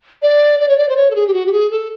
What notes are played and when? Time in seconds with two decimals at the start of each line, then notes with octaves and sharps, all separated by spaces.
0.22 D5
0.60 D5
0.69 C#5
0.78 D5
0.89 C5
0.97 C#5
1.11 A4
1.15 G#4
1.27 G4
1.34 F#4
1.46 G4
1.52 G#4
1.71 A4